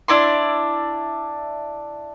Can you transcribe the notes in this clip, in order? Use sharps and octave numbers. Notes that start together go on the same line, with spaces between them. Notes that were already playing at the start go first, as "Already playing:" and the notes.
D4 E4 D5 C6